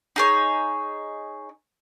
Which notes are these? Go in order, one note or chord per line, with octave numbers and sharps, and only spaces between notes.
D#4 G#4 C#5